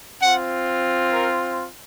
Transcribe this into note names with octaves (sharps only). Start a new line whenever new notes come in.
C4 F4 F#5
A#4